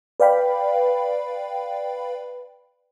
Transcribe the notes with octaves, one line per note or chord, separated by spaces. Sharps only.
B4 D5 F5 G5 B5